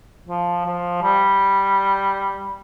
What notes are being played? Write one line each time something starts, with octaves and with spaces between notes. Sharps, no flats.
F3
F3
G3